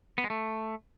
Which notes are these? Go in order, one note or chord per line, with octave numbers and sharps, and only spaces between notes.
B3
G#3
A3